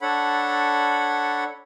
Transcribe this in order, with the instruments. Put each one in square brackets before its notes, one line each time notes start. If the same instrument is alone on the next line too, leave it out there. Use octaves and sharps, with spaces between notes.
[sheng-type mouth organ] D4 A4 C#5 F#5 B5